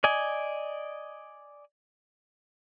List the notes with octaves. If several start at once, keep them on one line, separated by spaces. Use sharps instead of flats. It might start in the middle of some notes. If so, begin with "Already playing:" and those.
D5 D#5 G#5